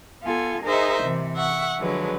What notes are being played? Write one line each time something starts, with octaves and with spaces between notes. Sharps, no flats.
B3 F4 A4 G#5
D#4 G#4 A#4 C5 D#5 E5
C3 E3
E5 F#5 C#6
D3 F3 F#3 G#3 B4